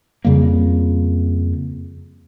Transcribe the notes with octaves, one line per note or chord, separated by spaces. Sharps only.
F2 C#3 G3 A#3